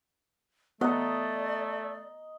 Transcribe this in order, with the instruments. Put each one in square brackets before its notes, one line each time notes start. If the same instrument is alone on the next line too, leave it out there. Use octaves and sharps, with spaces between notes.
[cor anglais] A3 [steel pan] B3 F#5 [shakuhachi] D5 [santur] D#5 A#5